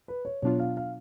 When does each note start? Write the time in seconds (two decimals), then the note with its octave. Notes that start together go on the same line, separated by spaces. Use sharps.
0.08 B4
0.25 C#5
0.42 B2 F#3 B3 D4 F4 C#5
0.59 F5
0.77 F5